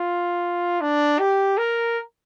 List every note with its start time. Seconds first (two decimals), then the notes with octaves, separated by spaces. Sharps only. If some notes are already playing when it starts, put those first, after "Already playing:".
Already playing: F4
0.81 D4
1.19 G4
1.58 A#4